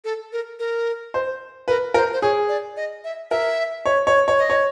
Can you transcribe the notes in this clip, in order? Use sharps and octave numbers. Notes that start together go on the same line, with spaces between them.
A4
A#4
A#4
C5
A#4 B4
A#4 C5
C5
G#4 C#5
D5
D#5
E5
A#4 E5
C#5
C#5
C#5
D#5
C#5